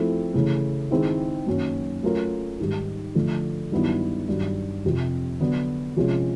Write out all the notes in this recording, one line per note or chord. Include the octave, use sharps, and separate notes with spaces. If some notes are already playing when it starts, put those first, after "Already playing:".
Already playing: F3 A3 C4 E4 A4
C#3 E3 A3
D#3 G#3 C4 E4 G#4
F#2 D#3 F#3 A#3 C#4
F#3 A3 C#4 F4 A#4
G#2 D#3 G3
D3 F3 A3
G2 D#3 F#3 B3 E4
G2 D#3 F#3
F2 C3 F3
D3 F#3 B3 D4
C3 F3 G#3 C#4 F4